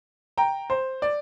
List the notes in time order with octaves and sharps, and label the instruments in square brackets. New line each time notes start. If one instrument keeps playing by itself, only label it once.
[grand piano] G5 A#5
C5
D5